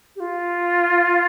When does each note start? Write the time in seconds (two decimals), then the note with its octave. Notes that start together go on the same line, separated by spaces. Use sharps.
0.15 G4
0.20 F4